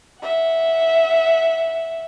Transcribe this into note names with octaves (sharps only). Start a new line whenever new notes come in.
E5 F#5